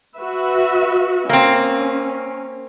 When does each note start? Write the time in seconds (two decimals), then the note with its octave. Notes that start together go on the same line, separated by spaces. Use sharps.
0.16 F#4 B4 E5
1.29 A#3 C4 C#4